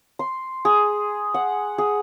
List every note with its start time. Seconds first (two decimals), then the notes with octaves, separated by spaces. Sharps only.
0.19 C6
0.65 G#4
1.34 F#5
1.78 G#4